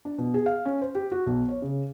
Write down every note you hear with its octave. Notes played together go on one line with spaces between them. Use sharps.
D4
B2
G#4
F5
C#4
C5
G4
F#4
B1
C#5
C#3